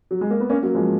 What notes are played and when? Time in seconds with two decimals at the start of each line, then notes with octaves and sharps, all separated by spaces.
0.11 F#3
0.21 G#3
0.30 A#3
0.40 B3
0.49 A#3 C#4
0.63 F#3 A#3
0.75 F3 G#3